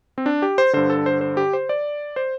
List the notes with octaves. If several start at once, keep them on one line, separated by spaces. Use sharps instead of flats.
C4
D4
G4
C5
G2 D3 C5
A4
C5
C5
G4
C5
D5
C5